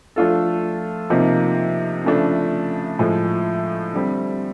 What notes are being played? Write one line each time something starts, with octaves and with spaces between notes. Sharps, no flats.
F3 A3 D4 F4 A4
C3 F3 A#3 D#4
C#3 F3 A3 D4
A2 F3 G#3
D3 G3 C4